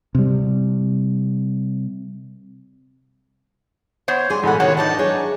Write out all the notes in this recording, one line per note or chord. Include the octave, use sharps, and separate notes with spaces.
C3 G3
B3 C5 C#5
F2 G3 G#4 C6
A1 B2 F#3 A4 F#5 B5
C3 D#3 F4 F#4 C#5 F#5
B3 D4 D#4 A5
F#3 E4 G#4 C#5